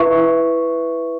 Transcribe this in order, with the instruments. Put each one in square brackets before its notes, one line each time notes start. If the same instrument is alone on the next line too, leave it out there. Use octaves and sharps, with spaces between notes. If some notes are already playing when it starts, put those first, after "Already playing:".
Already playing: [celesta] E4 B4 E5 C#6